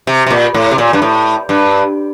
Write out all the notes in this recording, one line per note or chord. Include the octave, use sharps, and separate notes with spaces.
C3
C3
A#2
A2
C3
A#2
G2
A2
G2